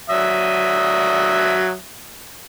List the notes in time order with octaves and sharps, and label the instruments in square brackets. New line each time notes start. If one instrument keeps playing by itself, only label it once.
[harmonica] F#3 E5 D#6